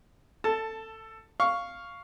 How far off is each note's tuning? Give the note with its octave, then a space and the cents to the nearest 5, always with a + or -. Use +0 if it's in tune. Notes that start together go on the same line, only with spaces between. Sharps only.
A4 +15 A5 +0
F5 +0 C#6 +5